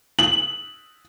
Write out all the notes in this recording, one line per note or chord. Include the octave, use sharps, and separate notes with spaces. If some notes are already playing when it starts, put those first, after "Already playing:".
F#7